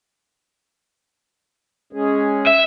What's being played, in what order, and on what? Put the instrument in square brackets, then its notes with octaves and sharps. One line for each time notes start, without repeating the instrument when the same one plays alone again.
[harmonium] G#3 C#4 G#4
[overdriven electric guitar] E5